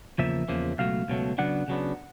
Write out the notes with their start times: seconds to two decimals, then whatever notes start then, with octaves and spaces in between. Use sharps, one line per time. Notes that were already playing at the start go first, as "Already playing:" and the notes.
0.18 E2 C#3 F3 A#3 E5
0.48 E2 C#3 F3 A#3
0.78 C#2 B2 F#3 A3 F5
1.08 C#2 B2 F#3 A3
1.38 C#3 F#3 B3 D4 F#5
1.68 C#3 F#3 B3 D4